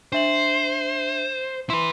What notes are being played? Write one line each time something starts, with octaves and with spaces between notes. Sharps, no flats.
D4 C5 E5 F#7
E4 B4 C6